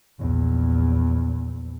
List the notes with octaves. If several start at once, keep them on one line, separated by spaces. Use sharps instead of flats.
A#1 E2